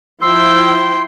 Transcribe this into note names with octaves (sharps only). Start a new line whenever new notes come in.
F3 E4 G5 C6 E6